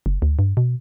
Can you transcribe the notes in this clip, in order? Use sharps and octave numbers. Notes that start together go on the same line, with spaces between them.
F#1
D2
G2
B2